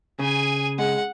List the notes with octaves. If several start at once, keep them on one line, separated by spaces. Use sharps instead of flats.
C#3 G#4 G#5
G#3 F#5